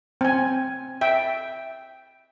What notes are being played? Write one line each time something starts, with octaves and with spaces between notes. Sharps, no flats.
C4 G#5
E5 G5